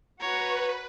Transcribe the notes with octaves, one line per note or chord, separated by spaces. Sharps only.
F#4 B4 C#5 A#5